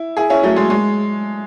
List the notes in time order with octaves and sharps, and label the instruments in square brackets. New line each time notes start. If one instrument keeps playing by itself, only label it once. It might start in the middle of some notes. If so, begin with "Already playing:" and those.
Already playing: [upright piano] E4
E4 G#4
C#4 E4
F#3 A3
G#3
G#3